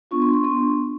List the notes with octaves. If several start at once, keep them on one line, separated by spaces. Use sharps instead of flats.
B3 D4 F4 C#6
C6
C#6
B3 D4 C6